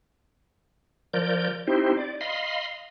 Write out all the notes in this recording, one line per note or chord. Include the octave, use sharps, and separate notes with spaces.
F3 A#4 D5 G6
C4 D#4 E4 G4 C5
D5
D#5 F5 B5 C6